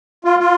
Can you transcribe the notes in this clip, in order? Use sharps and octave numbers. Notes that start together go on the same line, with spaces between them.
F4
F4